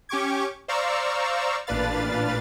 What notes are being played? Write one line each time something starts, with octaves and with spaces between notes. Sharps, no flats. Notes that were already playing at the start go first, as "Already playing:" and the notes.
C#4 G4 C#6 D6 G#6
C5 D5 F5 A#5 C#6 E6
A1 A#2 D4 B4 F5 A6